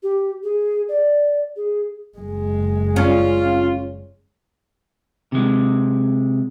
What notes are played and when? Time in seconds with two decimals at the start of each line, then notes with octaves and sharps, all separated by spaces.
0.03 G4
0.43 G#4
0.89 D5
1.56 G#4
2.18 F#1 G#3
2.96 C#4 F4
5.32 C3 G#3